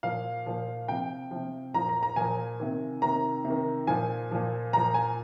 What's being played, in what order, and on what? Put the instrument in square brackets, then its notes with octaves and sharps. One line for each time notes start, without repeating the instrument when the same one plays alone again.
[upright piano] A#2 F3 F5
A#2 F3
C3 F3 G5
C3 F3
A#2 F3 A#5
A#5
A#5
A#2 F3 G#5
C3 D#3
C3 D#3 A#5
C3
D#3
A#2 F3 G#5
A#2 F3
A#2 F3 A#5
G#5